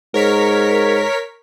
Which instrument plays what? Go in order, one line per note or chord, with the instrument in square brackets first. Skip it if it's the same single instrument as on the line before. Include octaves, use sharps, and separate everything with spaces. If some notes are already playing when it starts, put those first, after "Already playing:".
[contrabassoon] G#2 [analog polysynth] A#4 C#5 B6